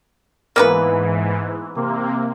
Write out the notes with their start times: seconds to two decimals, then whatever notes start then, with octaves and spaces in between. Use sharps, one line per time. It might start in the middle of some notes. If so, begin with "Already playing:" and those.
0.56 G#2 E3 A#3 B3 B4
1.76 C3 A#3